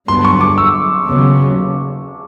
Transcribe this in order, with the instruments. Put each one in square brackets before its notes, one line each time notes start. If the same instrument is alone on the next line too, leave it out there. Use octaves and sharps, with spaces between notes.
[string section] G2 D3 F#3 B3 [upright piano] C6
[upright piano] C#6
D6
E6
[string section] D#2 C#3 F#3 B3